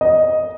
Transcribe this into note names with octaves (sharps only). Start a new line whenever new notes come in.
D#5